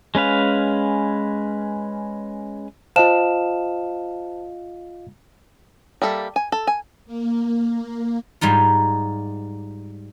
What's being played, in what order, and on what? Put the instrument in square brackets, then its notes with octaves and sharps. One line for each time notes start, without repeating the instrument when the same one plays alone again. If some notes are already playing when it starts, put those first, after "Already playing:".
[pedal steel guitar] G#3 C#4 B4 F5
[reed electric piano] F4 D#5 F5 [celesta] C5 A5 E7
[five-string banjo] G3 A#3 A4 E5
G#5
A4
G#5
[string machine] A#3
[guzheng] G#2 G3 D#4 F4